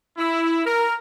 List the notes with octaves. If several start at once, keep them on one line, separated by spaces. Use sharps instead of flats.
E4
A#4